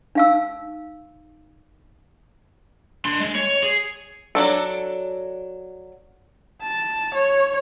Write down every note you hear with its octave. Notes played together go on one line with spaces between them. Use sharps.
D#4 F5 E6
D4 C6
G#3
C#5
G#4
F#3 D4 A4
A5
C#5